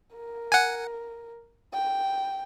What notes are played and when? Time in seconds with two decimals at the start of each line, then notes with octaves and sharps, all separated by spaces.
0.15 A#4
0.52 F#5 G#5
1.73 G5